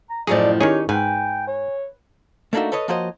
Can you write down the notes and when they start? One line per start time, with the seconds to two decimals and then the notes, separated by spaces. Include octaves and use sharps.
0.10 A#5
0.27 F#2 A2 F3 F#3 A3 G#4 D5 D#5
0.61 D#3 C#4 D#4 G4 G#4 C#5
0.89 G#2 B4 G5 G#5
1.47 C#5
2.53 A3 A#3 D4 D#4 F#4 E5
2.72 A4 B4 C#5 D#5
2.88 F3 A#3 F#4 C5 C#5 D#5